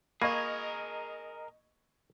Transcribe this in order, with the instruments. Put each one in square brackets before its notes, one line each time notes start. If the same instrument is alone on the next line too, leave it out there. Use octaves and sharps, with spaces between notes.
[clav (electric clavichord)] A#3 [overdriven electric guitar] G#4 A#4 [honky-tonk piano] D#5 G#6 [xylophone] B5 C#6